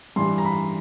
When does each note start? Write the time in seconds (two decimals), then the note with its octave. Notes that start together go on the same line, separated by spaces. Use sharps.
0.16 G2 E3 G3 C6
0.38 A#5
0.45 B5